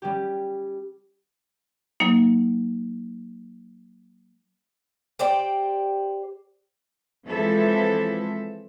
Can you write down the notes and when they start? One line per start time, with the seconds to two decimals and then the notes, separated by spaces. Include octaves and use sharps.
0.02 G3 C#4 G4
2.00 F#3 A#3 D#4
5.19 G4 C5 D5 G5
7.26 E3 F3 G#3 C4 A4 E5